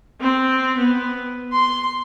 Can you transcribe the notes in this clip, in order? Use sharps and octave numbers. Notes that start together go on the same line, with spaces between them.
C4
B3
C6